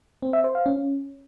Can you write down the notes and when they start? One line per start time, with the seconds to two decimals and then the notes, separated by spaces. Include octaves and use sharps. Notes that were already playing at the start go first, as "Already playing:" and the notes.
0.22 C4
0.33 E5
0.44 C5
0.55 F5
0.66 C#4